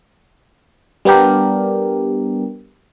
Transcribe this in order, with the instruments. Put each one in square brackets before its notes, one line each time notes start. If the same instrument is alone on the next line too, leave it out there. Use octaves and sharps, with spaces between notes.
[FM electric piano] G3 B3 D4 G4 A#4